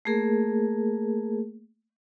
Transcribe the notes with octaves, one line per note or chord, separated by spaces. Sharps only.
A3 A#3 G#4 A#4